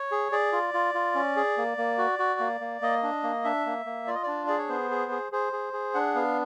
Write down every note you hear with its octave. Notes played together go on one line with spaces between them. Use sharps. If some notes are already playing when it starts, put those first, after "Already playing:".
Already playing: C#5
G#4
G#4 D5
F4
F4
F4
C#4
G#4
A#3
A#3
F#4
F#4
A#3
A#3
A#3 D#5
D4
A#3
D4 E5
A#3
A#3
F4 D5
D#5
D4 D5
G#4 D5
C#5
B3 C5
G#4
G#4
G#4 C5
G#4
G#4
D4 F#5
B3 F5